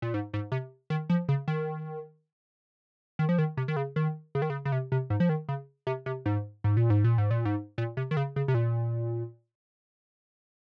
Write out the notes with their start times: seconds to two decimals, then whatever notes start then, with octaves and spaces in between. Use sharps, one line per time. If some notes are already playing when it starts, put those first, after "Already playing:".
0.02 A#2
0.14 G#2
0.34 G#2
0.52 C3
0.90 D#3
1.10 F3
1.29 C#3
1.48 D#3
3.19 D#3
3.29 F3
3.38 D#3
3.57 C3
3.68 D#3
3.76 C#3
3.96 D#3
4.35 C#3
4.42 D#3
4.50 C#3
4.65 C#3
4.72 C3
4.92 C3
5.10 G#2
5.20 F3
5.29 D#3
5.49 C#3
5.87 C3
6.06 C3
6.26 G#2
6.64 G#2
6.77 A#2
6.90 G#2
7.04 A#2
7.18 G#2
7.31 A#2
7.45 G#2
7.78 A#2
7.97 C3
8.11 D#3
8.17 C#3
8.36 C#3
8.48 C3
8.54 A#2